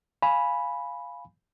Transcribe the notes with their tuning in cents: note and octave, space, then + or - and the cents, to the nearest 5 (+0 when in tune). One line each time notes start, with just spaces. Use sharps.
F5 +0 G#5 +0 B5 -5